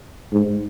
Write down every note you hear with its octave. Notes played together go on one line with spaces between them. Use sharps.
G#2